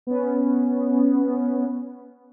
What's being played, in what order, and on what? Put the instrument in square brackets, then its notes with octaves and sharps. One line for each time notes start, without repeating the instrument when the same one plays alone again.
[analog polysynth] B3 C#4